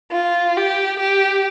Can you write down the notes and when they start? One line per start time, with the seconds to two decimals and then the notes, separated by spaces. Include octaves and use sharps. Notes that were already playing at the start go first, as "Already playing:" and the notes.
0.12 F4
0.57 G4
1.00 G4